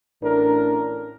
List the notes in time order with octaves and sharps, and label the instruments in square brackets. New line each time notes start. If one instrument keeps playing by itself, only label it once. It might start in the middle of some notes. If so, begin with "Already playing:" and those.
[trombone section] A1 A2 D4 A#4